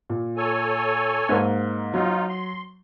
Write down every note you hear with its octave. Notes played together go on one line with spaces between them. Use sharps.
A#2
A4 C#5 G#5
G#2 A#3
F#3 D#4 F4
C6